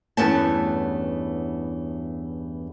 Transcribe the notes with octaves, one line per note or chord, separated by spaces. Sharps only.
E2 G2 A3 B3 C#4 A5